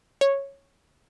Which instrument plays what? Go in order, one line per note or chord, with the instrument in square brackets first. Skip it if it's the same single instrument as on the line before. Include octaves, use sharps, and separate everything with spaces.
[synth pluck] C#5